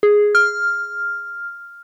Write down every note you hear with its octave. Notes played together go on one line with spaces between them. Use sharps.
G#4
F6